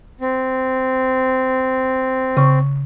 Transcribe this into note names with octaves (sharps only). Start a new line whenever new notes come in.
C4
C#3 C#6